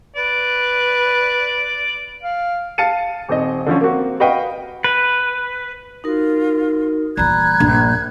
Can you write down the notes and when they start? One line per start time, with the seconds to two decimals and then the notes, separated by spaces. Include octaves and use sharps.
0.16 B4 D5
2.23 F5
2.78 F5 A5 A6 C#7 D#7
3.28 D#1 C4 D#5
3.66 D3 F3 C#4
3.81 A#3 C4 F#4
4.20 F#4 B4 D#5 F5 G5 B5
4.84 B4
6.04 D#4 F4 F#4 A#4
7.17 D#1 E3 D5 A#5 B5 F#6 G#6
7.60 A#1 G2